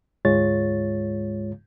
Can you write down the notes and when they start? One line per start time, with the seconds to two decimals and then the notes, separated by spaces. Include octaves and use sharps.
0.25 D2 G#2 G#3 F4 C#5 A6